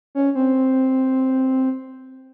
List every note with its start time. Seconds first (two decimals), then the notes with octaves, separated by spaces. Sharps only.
0.15 C#4
0.35 C4